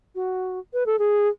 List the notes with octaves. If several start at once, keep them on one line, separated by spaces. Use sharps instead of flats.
F#4
B4
A4
G#4